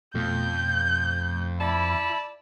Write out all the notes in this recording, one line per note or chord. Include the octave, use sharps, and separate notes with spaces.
F2 B2 F3 A3 G6
E4 D5 A5 B5